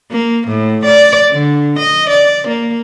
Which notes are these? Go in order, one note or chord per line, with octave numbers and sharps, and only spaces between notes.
A#3
A2
D5
D3
D#5
D5
A#3